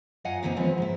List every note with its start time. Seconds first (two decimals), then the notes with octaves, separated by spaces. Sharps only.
0.25 F#2 F4 D#5 F5 F#5 G#5
0.43 A#2 D3 E3 A3 C4 D#4
0.56 C#3 E3 F3 G#3 B3 C4
0.78 G#2 E4